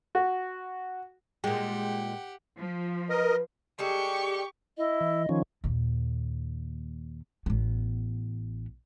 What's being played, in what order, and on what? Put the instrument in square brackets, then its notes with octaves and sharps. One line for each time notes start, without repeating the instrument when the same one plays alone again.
[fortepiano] F#4
[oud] A#2 G#3 [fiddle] G4 F#5 [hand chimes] G5
[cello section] F3
[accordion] A#4 D#5 [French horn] B4
[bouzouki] G3 G#3 A4 [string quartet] G4 C#6
[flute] E4 [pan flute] D#5
[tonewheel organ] E3
D#3 F3 C#4
[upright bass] D#2 A#2
A1 B3